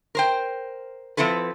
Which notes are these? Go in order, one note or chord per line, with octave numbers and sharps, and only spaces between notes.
A#4 C5 G5
F3 F#3 C4 E4 A4 B4